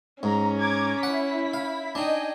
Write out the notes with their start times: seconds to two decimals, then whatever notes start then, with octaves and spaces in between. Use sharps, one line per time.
0.23 G#2 C#4 A#5
0.59 A#5 D6 G#6
1.03 E4 F#5 B6
1.54 F5
1.95 D4 D#4 D#5 G5 G#5